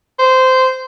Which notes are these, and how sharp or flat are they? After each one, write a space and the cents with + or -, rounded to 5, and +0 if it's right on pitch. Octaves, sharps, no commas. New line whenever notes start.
C5 -15